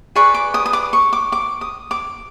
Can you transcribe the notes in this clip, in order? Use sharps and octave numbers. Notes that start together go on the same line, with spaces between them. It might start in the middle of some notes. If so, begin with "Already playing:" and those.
G#4 B4 D5 C#6
D6
D#6
D#6
D6
C#6
D6
D6
D#6
D6